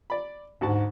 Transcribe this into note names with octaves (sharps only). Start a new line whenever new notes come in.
D5 B5
D2 G#2 F#4 A5